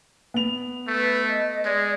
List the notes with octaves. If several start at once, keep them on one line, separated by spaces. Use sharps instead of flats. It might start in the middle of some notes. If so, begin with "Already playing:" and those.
B3 F7
A3 B4
D#5
G#3 D5